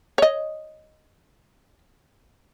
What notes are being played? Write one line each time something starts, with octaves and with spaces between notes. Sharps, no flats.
C#5 D#5